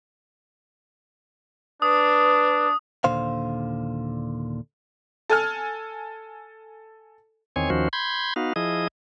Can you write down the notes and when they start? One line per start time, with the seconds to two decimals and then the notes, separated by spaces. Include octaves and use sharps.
1.82 D4 B4 D#6
3.04 D#2 A#2 D3 C5 F5
5.30 A4 G#5 F6
7.56 E2 D#3 C4 C#5 G#5
7.70 D#2 D#3 F3 C#4 F#4 C5
7.93 B5 C6 G6 G#6
8.36 B3 D#4 F#4 F5
8.56 F3 E4 G#4 D#5 D#6